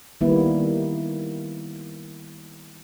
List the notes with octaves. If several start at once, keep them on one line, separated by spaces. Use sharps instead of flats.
D#3 G3 A#3 B3 E4